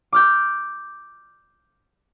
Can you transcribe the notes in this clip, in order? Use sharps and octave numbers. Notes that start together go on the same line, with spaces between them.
D6 F6 G6